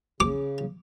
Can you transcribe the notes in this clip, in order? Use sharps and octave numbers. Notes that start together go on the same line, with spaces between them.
C#3 D6